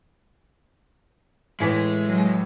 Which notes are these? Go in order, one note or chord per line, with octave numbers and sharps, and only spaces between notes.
A2 E3 G#3 B6
F#3